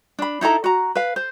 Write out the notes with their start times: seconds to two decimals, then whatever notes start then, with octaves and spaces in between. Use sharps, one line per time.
0.19 D4 B5
0.41 D#4 E4 A4 A#5
0.64 F#4 A#5
0.95 B4 F5
1.16 C5